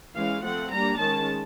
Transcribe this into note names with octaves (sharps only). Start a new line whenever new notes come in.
E3 G#3 C#4 F5
F3 A3 C4 F#5
G3 A#3 D4 A#5
D#3 G#3 C#4 A5